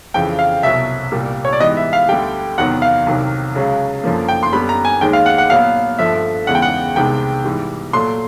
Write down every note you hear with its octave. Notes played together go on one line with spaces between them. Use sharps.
F2 C#3 E3 G5
F5
C2 B2 F#3 E5
C2 A#2 G3 A#3
C#5
D5
G#2 E3 G3 B3 D#5
E5
F5
D2 D3 G3 G5
E2 C3 D#3 F#3 B3 F#5
F5
C2 C3 D#3 F#3
C#2 C#3 F#3
F#2 D3 F3 A#3
G5
C6
F#2 D3 G3 B3 B5
A#5
G#5
D#2 D#3 G#3 G5
F5
F#5
F#5
A#2 F#3 B3 F5
G2 D3 F3 A3 E5
E2 C#3 E3 G#3 B3 F#5
G5
F#5
C2 C3 D#3 G#3 B3 G5
G#2 E3 G3
A#2 F#3 A3 C6